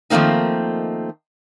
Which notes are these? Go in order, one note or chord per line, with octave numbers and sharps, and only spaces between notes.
D#3 F3 A3 A#3 C4 D#4